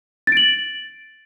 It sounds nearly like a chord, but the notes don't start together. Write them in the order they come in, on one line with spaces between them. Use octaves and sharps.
A6 D7 F#7